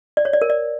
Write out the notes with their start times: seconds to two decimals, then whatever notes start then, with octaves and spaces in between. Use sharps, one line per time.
0.17 D5
0.25 C#5
0.33 D5
0.42 A#4
0.50 D5